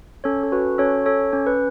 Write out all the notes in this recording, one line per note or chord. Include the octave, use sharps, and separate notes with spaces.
C#4 A4 C#5
A4
F#4 B4
C#4 A4 C#5
A4 C#5
C#4
B4